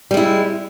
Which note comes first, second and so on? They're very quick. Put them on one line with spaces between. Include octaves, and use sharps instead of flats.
G3 G#3 E4